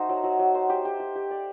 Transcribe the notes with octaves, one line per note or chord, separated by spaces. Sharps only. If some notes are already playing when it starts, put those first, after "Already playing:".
Already playing: A3 D#4 F#4 C5
F#3
F#3
F#3
C5
G4
G4
G4
G4
D5